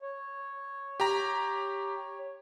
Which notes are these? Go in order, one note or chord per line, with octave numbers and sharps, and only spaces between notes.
C#5
G4 A#5